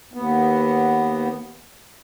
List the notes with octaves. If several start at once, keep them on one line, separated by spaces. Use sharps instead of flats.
D#2 B3